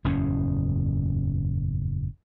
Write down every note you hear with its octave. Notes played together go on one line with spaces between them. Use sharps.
F#1 E2 A2 C#4